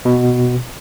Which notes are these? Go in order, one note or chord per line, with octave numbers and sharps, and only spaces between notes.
B2